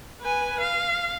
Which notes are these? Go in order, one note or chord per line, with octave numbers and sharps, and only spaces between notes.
B4 G#5
F5